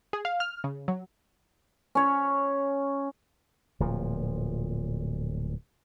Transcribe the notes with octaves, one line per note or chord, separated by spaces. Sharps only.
G#4
F5
F6
C#3
F#3
C#4 C#5
D1 A#2 F3